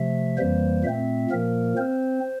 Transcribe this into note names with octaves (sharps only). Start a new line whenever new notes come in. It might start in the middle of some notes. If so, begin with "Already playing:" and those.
Already playing: C3 F3 A3 E5
F2 E3 G3 A#3 C5
A#2 A3 C4 E5
A#2 F3 A#3 A#4
C4 C5